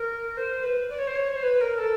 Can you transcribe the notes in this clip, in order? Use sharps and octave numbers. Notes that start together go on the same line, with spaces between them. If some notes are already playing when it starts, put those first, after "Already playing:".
Already playing: A#4
C5
B4
D5
C#5
C5
C#5
C5
B4
A#4
A4